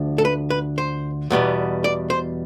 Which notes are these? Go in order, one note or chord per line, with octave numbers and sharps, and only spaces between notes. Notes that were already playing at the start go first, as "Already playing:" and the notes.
Already playing: D2 D3 F3
A4
B4
B4
C5
E2 B2 G3 B3
D5
C5